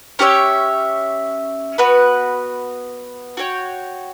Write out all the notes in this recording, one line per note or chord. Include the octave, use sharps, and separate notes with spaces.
C#4 G4 C#5 E5
B3 F#4 B4
F#4 C#5 G5